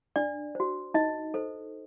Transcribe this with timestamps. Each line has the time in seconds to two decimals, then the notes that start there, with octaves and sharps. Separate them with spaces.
0.16 D4 D5
0.55 F#4 C5
0.94 D#4 D#5
1.34 A4 C5